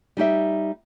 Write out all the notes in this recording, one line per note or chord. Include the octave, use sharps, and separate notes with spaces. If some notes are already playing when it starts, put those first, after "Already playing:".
G3 D#4 G4 E5